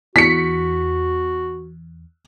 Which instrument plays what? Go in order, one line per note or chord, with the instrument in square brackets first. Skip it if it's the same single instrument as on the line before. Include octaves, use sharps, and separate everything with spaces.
[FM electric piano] E2 [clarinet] F#4 [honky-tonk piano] B6 C#7